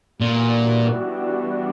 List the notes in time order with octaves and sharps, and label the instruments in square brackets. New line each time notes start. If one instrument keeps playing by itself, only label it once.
[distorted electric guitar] A#2 [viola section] E3 G3 B3 D4 F#4